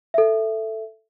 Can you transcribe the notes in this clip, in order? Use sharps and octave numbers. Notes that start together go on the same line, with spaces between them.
A4 E5